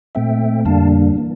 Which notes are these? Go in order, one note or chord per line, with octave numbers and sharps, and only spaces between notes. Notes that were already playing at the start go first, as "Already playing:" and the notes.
A#2 A3 C4 E5 G5
F2 D3 G3 A#3 D4 F5 A5
E3 A#3